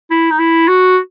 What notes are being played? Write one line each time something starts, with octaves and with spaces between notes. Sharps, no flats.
E4
D#4
E4
F#4